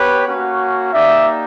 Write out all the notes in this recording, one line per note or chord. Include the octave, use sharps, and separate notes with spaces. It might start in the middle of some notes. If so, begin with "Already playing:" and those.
Already playing: B3 G4 B4 C#5
A#3 C#4 F#4
A#3 D#4 G4 D5 E5